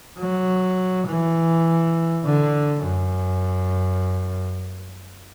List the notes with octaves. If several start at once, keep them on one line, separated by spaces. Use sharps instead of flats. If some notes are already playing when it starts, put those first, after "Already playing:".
F#3
E3
D3
F#2